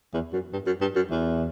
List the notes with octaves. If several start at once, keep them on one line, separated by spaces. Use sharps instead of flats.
E2
F#2
G2
F#2
G2
F#2
E2